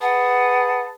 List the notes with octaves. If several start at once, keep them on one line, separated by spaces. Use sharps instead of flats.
G#4 B4 F#5 A5